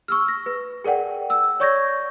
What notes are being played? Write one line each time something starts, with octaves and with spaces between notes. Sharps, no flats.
C#6 E6 F6
A#6
B4
G#4 A#4 D5 F#5 G5
E6
C#5 D5 C#6 G6 G#6 A#6